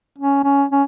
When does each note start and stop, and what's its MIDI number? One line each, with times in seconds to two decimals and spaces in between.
0.18 0.44 61
0.44 0.65 61
0.72 0.83 61